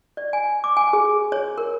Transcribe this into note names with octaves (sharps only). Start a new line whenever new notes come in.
D5
G#5
D6
G#5
G#4
C#5
A#4